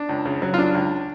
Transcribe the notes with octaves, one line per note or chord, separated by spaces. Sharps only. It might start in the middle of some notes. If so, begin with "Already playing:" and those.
Already playing: D4
C#2
C#3
F#3
F4
C#3 D4
C#2